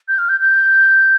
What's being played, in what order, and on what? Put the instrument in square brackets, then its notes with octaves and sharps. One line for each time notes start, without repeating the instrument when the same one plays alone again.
[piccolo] G6
F6
G6
G6